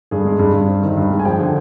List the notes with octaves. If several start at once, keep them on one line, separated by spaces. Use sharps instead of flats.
G2 G#4
G#3
G2
G2
C4
D#3
G2
G#3
G#5
F3 G5
D3